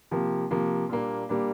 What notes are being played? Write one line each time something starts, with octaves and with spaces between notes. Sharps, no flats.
C3 F3 A#3
C3 F3 A#3
A#2 G3 A#3 D4
A#2 G3 A#3 D4